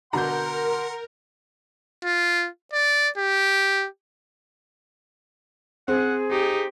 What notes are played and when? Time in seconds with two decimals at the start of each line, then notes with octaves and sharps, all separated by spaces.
0.13 B2 D3 A#4 F#5 A#5 C6 G6
2.04 F4
2.73 D5
3.18 G4
5.88 C4 G#4 F#5
6.31 D#4 G4